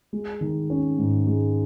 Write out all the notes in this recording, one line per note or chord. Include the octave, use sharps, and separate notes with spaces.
G#3
D#3
C#4
G#2
G#3